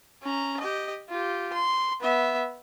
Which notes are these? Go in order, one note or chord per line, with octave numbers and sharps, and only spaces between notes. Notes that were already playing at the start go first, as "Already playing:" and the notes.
C#4 A#5
G4 D#5
F4 G4
C6
B3 E5